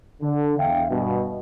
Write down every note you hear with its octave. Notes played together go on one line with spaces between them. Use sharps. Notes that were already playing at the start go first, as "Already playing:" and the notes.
D3
E2 E5 F5 G5
G2 B2